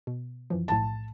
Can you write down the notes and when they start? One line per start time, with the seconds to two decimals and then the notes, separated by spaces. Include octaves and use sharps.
0.07 B2
0.50 F#2 E3 F3
0.68 B1 A2 A5